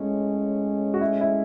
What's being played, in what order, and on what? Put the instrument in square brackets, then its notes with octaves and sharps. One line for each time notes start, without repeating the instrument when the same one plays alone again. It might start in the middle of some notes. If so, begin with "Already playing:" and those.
Already playing: [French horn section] A2 G#3 C#4
[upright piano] F#4
E4
E4